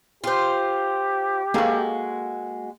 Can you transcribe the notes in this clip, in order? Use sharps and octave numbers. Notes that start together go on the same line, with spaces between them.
F4 G4 C5
G#3 A#3 F#4 A4 F5